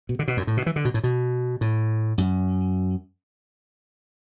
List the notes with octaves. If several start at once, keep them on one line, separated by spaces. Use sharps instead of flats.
B2
D3
B2
F#2
A2
B2
E3
D3
B2
A2
B2
A2
F#2